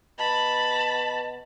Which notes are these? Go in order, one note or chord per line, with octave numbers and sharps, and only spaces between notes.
B2 A5 B5